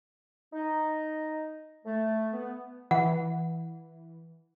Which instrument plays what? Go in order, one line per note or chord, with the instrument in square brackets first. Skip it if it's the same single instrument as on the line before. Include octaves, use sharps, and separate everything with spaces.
[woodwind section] D#4
A3
B3
[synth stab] E3 [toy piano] F#5